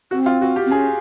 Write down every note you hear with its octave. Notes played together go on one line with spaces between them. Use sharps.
C4 F#4
F4
F#4
G4
C4
C#4 G#4